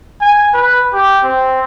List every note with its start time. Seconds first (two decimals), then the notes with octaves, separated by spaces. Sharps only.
0.21 G#5
0.54 B4
0.93 G4
1.24 C4